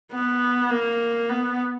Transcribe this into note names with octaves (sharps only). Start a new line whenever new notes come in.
B3
A#3
B3